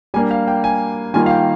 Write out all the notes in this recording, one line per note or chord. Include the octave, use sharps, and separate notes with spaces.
G3 A#3 D4 G#5
F5
G5
G#5
D#3 G3 A#3 F4 G#5
F5
G5